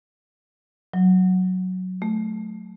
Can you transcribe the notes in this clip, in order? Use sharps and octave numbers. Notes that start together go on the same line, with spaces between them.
F#3
A3